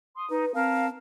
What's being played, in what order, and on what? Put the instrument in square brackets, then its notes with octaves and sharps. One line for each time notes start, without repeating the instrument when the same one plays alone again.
[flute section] C6 D#6
[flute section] D#4 [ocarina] B4
[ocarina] C4 [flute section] A#4 F5 A5